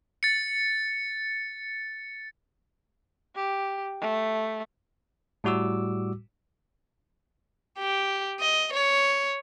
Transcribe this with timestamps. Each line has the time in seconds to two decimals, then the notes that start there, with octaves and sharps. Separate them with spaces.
0.23 A6 C#7
3.35 G4
4.01 A3
5.44 A2 G3 F#4 D6 E6
7.78 G4
8.40 D#5
8.73 C#5